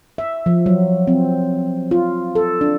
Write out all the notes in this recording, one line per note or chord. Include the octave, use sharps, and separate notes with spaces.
E5
F3
F#3
C4
F4
A4
D4